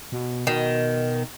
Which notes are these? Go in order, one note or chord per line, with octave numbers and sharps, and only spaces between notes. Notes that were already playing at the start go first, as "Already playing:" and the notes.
B2
B2 D#3